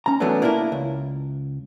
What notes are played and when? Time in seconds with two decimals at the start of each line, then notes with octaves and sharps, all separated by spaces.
0.06 C#4 A#5
0.20 E3 F#3 A3 B3 C#4 D4
0.42 A#3 D4 E4 G#4 A#4
0.72 C#2